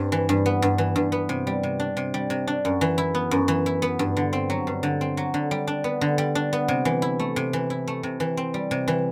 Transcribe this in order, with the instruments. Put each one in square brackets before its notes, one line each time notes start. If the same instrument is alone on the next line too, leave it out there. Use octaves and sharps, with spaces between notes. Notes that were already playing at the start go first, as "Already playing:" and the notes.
Already playing: [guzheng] G2 C4
E3
G2
B3
G2
E3
G2
B3
C3
G3
C3
D4
C3
G3
C3
D4
F#2
E3
E4
B3
F#2
E3
E4
B3
G2
D3
C4
F#3
G2
D3
C4
F#3
D3
G3
D4
B3
D3
G3
D4
B3
C3
E3
E4
A3
C3
E3
E4
A3
C3
E3
C4
G3
C3
E3